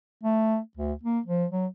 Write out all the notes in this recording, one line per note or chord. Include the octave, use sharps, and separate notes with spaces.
A3
D2
A#3
F3
F#3